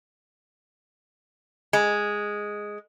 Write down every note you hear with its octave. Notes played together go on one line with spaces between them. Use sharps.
G#3